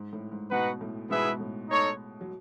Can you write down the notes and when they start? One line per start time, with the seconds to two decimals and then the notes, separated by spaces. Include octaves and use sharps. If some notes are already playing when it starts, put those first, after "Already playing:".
Already playing: G#2
0.13 A2
0.32 G#2
0.51 G#2 B2 D#4 F#4 B4 F#5
0.81 A2
1.10 G#2 B2 B3 E4 G#4 B4 E5
1.26 G#2
1.40 A2
1.70 D#4 A4 C#5
2.21 F#3